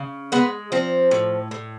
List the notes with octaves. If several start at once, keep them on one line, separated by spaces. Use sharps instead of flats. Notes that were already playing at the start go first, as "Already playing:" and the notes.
Already playing: C#3
G#3 B3
F3 C4
A2
A2